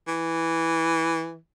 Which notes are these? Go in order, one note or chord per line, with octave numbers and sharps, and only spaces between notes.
E3